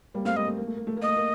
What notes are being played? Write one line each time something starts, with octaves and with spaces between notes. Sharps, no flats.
G3 A#3
A3 C4 F5
G3 A#3 D#5
A3
A#3
A3
A#3
A3
A#3
A3 D#5
A#3